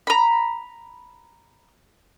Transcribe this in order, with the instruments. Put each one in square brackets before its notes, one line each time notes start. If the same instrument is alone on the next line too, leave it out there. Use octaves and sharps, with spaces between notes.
[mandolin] A#5 B5